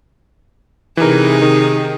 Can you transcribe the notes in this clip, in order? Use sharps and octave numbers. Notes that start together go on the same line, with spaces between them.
C3 E3 D#4 G#4 A#4
D#3